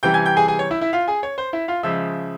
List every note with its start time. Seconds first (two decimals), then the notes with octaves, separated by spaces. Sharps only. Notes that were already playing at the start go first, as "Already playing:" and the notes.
0.03 C3 E3 G3 G5 G6
0.14 G#5 G#6
0.26 G5 G6
0.37 G#4 G#5
0.48 G#4 G#5
0.59 C#5
0.71 E4 E5
0.81 E4 E5
0.93 F4 F5
1.08 G#4 G#5
1.23 C#5
1.38 C5
1.53 E4 E5
1.68 F4 F5
1.83 C#3 F3 G#3 E5 E6